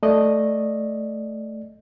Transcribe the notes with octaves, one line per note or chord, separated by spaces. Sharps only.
A3 D5 D#5